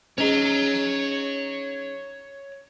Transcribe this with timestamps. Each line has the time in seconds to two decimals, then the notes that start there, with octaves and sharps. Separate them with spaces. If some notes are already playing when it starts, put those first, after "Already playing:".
0.18 C#4 D#4 G#4 C#5 A#5